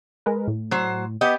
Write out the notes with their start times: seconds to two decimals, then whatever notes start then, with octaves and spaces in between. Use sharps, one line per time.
0.26 G#3 A#4 B4
0.48 A2
0.71 F#3 C5
1.21 B3 G4 D#5